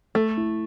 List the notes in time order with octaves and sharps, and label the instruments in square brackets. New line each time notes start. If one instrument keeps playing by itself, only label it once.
[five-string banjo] A3 [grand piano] A4
[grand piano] E4